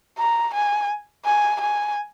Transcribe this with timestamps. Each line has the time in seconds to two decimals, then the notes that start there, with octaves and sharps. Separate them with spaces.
0.19 A#5
0.54 G#5
1.25 G#5
1.61 G#5